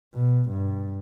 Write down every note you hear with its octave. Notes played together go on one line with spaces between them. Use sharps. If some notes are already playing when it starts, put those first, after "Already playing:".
B2
G2